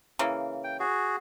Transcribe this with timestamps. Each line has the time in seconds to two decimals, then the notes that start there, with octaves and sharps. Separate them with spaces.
0.19 C#3 E3 A#3
0.64 G5
0.80 F#4 G#4